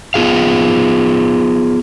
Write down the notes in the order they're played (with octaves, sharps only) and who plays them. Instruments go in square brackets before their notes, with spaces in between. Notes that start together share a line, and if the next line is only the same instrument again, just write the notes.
[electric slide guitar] B3 F4 G#4 F5